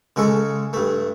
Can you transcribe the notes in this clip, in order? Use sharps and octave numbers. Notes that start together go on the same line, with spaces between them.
C#3 G#3 A4 C#6
G2 A3